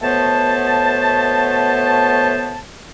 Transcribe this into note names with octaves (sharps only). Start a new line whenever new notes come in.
B2 A3 B3 C5 C#5 A5